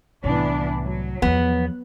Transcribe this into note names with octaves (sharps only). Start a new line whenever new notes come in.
C2 A2 E3 B3 D4
F#3
E2 F3 B3